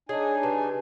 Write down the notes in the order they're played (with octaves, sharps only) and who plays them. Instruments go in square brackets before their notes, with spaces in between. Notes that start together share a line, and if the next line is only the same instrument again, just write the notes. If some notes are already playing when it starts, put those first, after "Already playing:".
[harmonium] D4 D#4 G#5 [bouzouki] G#4 [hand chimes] C#5 D#5 G#6
[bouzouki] C#3 [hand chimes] G4 B4 A5